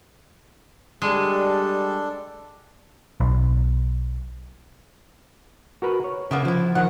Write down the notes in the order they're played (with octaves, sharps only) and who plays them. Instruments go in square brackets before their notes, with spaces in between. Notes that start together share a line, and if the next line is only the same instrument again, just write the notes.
[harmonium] G3 [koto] G#3 [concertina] D4 A4
[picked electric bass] B1
[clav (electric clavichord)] F#4 A#4 B4
C#5
[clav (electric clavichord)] C#3 [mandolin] A#3 B3 E4
[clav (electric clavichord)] F3 [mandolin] B3 E4
[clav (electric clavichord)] D#3 F3 [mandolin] F#5